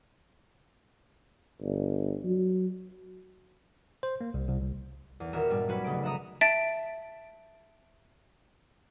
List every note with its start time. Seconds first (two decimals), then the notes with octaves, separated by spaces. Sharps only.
1.61 G1
2.24 F#3
4.03 C5
4.21 A#3
4.34 C2
4.48 C2
4.62 C2
5.20 E2
5.33 D#1 F#4 A#4 E5
5.50 G2 A#2 G3
5.68 F#3 C#4 F#4 B4
5.84 F1 C#3 A3 D7
6.03 E5 F#5 A#5 D#6
6.41 E5 A5 A6 B6 D7